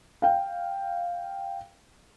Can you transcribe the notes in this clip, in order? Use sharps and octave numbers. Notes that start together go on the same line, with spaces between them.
F5 G5